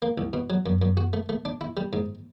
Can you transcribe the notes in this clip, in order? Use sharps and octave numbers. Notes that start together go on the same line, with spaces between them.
A#3
C2
B2
F#3
F#2
F#2
F#4
A3
A3
D4
E4
G3
G#2